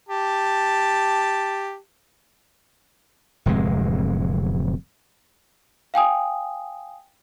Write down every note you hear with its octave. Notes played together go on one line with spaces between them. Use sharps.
G4 A5
D1 F2 C3 G#3
F5 G5 G#5 D#6